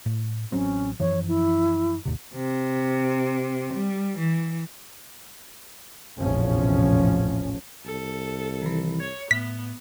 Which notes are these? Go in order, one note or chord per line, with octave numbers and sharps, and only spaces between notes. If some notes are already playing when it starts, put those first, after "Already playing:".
A2
A1 F#3 C4 C#4
F#2 E3 F3 C#5
E4
G#1 D#2 C3
C3
G3
E3
F1 A#1 E2 A2 F3 C#4
C2 A4
D#3 E3
C#5 G#6
A2 B3 B6